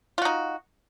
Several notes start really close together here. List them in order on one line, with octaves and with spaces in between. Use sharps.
F4 F#4 D#4